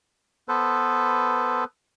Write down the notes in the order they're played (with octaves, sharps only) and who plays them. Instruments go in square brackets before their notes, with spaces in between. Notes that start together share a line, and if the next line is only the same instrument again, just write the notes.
[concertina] B3 A4 B4 C5